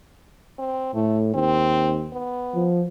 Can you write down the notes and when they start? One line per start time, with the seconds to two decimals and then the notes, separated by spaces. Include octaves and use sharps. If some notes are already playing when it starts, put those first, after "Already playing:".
0.58 C4
0.94 A2 A3
1.34 D#2 C4
2.12 B3
2.54 F3